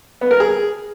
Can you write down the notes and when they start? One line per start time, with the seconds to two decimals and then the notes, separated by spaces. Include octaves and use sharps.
0.21 B3
0.31 A#4
0.40 G#4